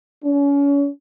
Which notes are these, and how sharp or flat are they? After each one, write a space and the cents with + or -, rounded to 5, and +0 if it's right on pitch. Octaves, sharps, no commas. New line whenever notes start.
C#4 +35